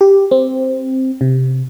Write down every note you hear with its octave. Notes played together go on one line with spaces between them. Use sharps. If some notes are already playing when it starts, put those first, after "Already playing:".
G4
C4
C3